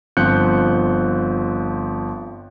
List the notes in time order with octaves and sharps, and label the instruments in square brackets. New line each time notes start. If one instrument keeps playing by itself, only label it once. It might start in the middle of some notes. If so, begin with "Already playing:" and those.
[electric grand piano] G1 F3 C4 F#6 G6 C#7